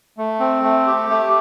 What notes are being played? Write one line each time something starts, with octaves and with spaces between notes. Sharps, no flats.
A3
C4
A3
G4
A3